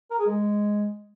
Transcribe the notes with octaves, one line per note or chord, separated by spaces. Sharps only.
A#4
G#4
G#3